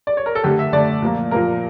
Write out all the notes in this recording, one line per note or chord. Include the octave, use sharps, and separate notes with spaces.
D5
C#5
A#4
A4
D3 A3 G4
E5
D3 A3 D5
A#2 F3 A#3
A#2 F3 A#3 A#4